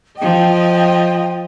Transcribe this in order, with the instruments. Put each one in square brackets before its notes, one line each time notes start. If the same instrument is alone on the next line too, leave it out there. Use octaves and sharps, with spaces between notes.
[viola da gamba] F3 D#5 [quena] G5